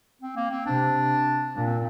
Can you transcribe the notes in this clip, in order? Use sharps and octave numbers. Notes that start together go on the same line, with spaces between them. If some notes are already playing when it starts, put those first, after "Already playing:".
C4
A#3
C4
C3 D4
A#2 D4
C4